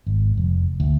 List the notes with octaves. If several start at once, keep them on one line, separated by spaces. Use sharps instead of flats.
G#1
F1
D2